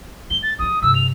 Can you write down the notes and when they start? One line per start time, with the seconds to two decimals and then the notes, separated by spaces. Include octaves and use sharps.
0.30 G#3 G7
0.43 A6
0.59 G2 G3 D#6
0.82 G2 C3 E6
0.95 F7